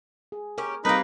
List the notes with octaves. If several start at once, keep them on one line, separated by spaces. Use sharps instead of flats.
G#4
C#4 G4 A#4
G3 A#3 C4 D#4 A#4 B4